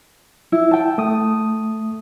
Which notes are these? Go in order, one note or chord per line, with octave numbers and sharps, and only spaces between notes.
E4
G5 A5
A3 D#6